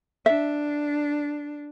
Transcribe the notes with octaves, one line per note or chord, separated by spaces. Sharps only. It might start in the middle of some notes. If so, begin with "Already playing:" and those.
D4 E5